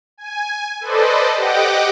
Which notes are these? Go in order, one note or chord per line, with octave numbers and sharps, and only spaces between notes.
G#5
A4 B4 C5 D5 D#5
G4 D#5 F#5 G5 D6